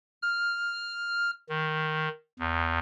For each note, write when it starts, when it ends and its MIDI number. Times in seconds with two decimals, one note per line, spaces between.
0.22 1.31 89
1.49 2.08 51
2.39 2.79 40